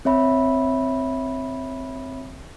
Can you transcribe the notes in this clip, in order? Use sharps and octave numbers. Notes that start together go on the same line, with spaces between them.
C4 C#5 E5 B5